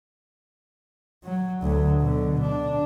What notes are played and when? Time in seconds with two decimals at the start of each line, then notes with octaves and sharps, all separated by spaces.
1.24 F#3
1.62 D2 F#3
2.00 B2 D3
2.41 D4